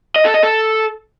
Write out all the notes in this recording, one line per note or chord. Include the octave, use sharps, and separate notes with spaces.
D#5
A4
D#5
A4